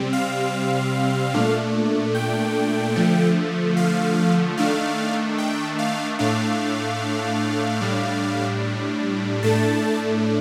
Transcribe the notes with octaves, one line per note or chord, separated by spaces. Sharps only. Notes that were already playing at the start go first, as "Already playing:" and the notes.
Already playing: C3 G3 C4
F5
A#2 A3 D4
G5
D3 F3 A3
F5
D#3 A3 D4 F5
G5
F5
A2 A3 D4 F5
A2 G3 D4
A2 A3 D4 A5